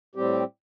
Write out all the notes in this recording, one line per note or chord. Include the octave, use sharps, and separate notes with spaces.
A2 G3 C4 G4